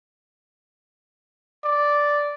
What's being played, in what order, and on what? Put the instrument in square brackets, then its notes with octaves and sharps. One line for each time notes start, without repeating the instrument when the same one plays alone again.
[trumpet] D5